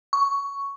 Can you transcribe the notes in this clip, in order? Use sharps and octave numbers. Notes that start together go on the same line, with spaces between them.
C#6